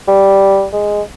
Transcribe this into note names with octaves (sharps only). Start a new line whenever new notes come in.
G3
G#3